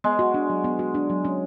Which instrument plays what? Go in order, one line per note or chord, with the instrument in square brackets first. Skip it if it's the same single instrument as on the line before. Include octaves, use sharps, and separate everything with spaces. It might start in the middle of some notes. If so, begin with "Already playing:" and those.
[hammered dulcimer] G#3 [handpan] B3
[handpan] F#4
D4
F#3
B3
F#4
D4
F#3
C#4